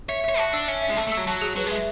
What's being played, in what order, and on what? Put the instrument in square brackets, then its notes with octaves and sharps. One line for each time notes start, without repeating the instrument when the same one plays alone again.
[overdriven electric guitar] C#5 [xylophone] E5
[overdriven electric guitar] C#5 [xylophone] E5
[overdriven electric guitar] F#4 [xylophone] A5
[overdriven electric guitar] D4 [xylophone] E6
[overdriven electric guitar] C#4 [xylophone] E5
[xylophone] E5
[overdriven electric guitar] G#3
[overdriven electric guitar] A3 [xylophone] A5
[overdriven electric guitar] A3 [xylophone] E6
[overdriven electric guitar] F#3
[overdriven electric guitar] F#3 [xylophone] A5
[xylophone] G#4
[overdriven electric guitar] F#3 [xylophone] B4
[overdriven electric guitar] G#3
[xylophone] E5